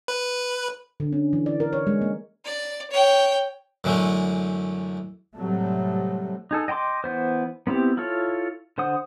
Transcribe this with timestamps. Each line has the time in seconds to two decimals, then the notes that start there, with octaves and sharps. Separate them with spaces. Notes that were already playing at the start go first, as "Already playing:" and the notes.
0.08 B4
1.00 D3
1.13 C#4
1.33 E3
1.46 D5
1.60 A#4
1.73 C#5
1.87 G#3
2.02 A#3
2.45 D5
2.90 C#5 G5
3.84 F#2 D3 E3 G#3 A3
5.36 A2 C3 F#3 G3 A3
6.51 D#4 G#4 A4
6.68 D#5 G5 A5 C6 D6
7.04 E3 B3 C5
7.67 B3 C4 E4 G4
7.97 E4 F4 A4 C#5
8.78 D3 C5 F#5 D#6